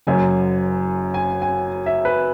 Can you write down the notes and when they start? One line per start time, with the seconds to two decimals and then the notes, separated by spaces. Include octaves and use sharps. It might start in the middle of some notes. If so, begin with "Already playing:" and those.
0.07 F#1 F#2 F#3 G#5
1.14 G#5
1.42 G#5
1.86 E5
2.05 B4